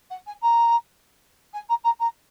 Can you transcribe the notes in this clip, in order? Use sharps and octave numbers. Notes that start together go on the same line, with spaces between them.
F#5
G#5
A#5
G#5
A#5
A#5
A#5